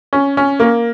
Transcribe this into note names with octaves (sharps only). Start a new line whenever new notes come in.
C#4
C#4
A#3